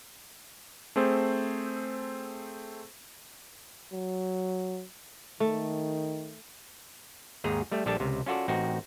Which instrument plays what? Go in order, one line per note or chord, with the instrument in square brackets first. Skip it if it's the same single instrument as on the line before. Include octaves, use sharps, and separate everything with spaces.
[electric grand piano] A3 C4 G#4 A4 C5
[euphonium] F#3
[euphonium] D#3 [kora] A3
[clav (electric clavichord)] D#2 G#2 G#4 A#5
G3 A3
A#1 G3 D4 G4 A4 A5
C#2 C3
C#4 F4 F#4 A4 D5
A1 C4 D#4 F#4